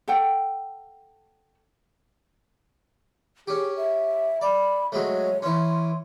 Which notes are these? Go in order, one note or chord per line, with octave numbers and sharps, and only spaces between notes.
A4 F#5 G5
C#4 G4 G#4
E5
D5 B5
F#3 G#3 A3 C#5
E3 C#4 C6